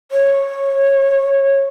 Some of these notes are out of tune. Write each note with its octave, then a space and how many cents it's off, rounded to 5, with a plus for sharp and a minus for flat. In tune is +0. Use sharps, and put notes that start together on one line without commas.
C#5 -15